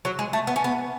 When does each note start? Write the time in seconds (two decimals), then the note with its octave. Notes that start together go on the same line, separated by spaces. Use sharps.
0.05 F#3
0.19 G#3
0.33 A3
0.47 B3
0.56 C#4
0.64 B3